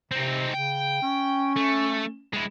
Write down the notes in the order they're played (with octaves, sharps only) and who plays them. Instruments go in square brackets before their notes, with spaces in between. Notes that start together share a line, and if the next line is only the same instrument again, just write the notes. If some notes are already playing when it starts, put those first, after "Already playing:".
[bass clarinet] C3 [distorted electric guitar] C4 D#4
[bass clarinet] C#3 [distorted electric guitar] G5
[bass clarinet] C#4
[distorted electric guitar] A3
G#3 E4